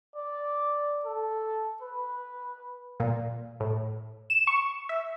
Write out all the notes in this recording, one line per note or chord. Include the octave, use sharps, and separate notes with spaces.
D5
A4
B4
A#2
A2
E7
C#6
E5